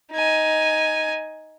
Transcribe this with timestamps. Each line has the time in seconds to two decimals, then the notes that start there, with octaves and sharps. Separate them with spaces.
0.12 D#4 G#5